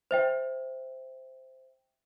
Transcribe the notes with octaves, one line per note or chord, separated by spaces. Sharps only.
C5 E5 G5